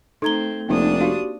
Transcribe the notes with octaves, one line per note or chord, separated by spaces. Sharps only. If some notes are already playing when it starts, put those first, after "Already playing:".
A3 C4 D#4 A4 A#5 G#6 G7
F1 A#3 C4 D4 D#4 D#6
F#4 G4 F5